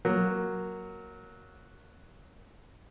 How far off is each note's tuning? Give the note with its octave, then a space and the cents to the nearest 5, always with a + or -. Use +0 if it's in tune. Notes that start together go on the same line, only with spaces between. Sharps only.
F#3 +0 A#3 +5